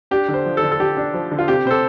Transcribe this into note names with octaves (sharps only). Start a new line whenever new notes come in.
D4 G4
D3
C5
F3
A4
D3
A4
D3 G4
D4
F3
D3
F4
C3 G4
C3 C5
A4